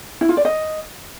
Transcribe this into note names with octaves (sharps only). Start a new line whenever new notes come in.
E4
F4
D5
D#5